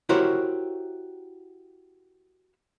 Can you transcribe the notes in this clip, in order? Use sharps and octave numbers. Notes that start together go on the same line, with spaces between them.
E4 F#4 G4 A#4 C5 C#5